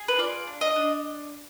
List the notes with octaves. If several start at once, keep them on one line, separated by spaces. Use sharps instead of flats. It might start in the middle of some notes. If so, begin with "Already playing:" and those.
Already playing: G#4
B4
F4 D5
D4
D#5
D4